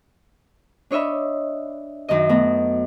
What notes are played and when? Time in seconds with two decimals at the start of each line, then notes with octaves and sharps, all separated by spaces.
0.91 D4 C#5 D#5 E5 B5
2.09 F#2 D#3 D#5
2.29 A3 B3 F#4